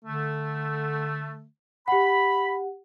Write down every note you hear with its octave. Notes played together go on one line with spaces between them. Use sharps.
D3 A3
G4 F#5 B5